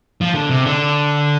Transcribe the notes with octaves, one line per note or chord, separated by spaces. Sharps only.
F3
D3
C3
D3